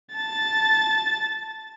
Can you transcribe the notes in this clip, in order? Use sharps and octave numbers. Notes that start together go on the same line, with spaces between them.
A5 A6